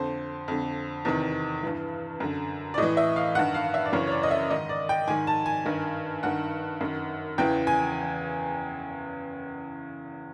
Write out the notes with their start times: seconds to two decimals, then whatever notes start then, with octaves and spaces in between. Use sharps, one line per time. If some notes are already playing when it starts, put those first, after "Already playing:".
Already playing: F2 D3 C5
0.48 F2 D3
1.05 E2 C3 D#3
1.63 G2 E3
2.20 F#2 D3
2.74 D5
2.78 A2 E3 D#5
2.97 E5
3.16 F5
3.35 G2 D#3 F#5
3.54 F5
3.74 E5
3.85 D5
3.92 F#2 C#3 E3 C#5
4.07 C#5
4.12 D5
4.23 D#5
4.31 E5
4.50 G#2 D#3 D#5
4.69 D5
4.89 G5
5.08 G#2 D#3 G#5
5.27 A5
5.46 G#5
5.66 G2 D#3
6.23 G2 D#3 F#5
6.81 F#2 D#3
7.38 E2 C#3 E3 G5
7.67 G#5